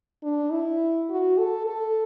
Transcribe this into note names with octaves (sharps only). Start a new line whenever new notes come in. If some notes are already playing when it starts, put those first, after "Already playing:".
D4
E4
F#4
A4
A4